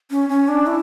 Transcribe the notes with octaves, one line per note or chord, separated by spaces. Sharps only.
C#4
C#4
D4
E4